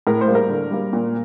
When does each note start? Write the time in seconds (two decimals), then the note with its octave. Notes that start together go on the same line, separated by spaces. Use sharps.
0.07 A2 A#4
0.21 C5
0.28 G3 A#3
0.35 A#4
0.49 D3
0.71 G3 A#3
0.93 A#2